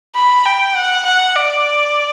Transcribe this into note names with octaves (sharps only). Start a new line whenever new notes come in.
B5
G5
F#5
F#5
D5